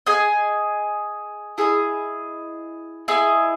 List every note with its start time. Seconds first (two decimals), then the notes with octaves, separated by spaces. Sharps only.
0.06 G#4 D#5 G#5
1.58 E4 G#4 D#5
3.08 E4 G#4 D#5